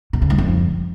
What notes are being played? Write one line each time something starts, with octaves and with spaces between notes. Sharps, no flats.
B2
C#3
G#2
F2